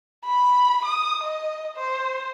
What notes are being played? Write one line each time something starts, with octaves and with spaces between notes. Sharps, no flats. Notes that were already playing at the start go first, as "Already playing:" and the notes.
B5
D#6
D#5
C5